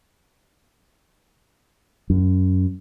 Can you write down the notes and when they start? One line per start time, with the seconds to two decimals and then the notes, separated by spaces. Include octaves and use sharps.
2.10 F#2